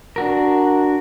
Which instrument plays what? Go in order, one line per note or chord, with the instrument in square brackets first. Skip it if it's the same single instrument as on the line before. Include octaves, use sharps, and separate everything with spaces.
[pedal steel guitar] D4 F#4 A#4